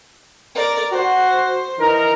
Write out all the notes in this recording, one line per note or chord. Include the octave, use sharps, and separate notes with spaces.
A#4 D5
F#4 C5
E3 D#4 A#4